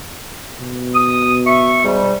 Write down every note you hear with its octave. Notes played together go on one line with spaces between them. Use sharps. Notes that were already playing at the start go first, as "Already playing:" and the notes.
B2
D#6
E5 C#6
G#2 G3